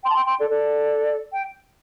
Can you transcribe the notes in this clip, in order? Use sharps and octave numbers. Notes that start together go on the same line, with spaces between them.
G5 C6
A5
G5 C6
G5 C6
A4 D5
A4 D5
G5